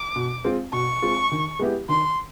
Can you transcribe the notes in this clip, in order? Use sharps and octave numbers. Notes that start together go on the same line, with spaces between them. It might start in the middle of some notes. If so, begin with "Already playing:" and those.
Already playing: D6
B2
G#3 C4 F4
B2 C#6
G#3 C4 F4
D#3
G#3 B3 E4 G4
D#3 C6